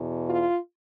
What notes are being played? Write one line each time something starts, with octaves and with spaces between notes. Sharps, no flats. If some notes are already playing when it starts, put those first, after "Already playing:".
Already playing: E2 B2
F4